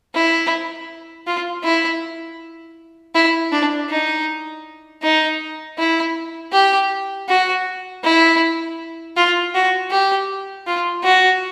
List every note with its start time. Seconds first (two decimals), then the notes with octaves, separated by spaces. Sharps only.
0.15 E4
1.27 F4
1.64 E4
3.15 E4
3.52 D4
3.90 D#4
5.03 D#4
5.79 E4
6.53 G4
7.29 F#4
8.04 E4
9.17 F4
9.55 F#4
9.91 G4
10.67 F4
11.04 F#4